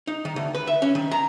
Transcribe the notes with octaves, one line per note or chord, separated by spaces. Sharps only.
D#4
D#3
D2
B4
E5
C#4
D#3
A#5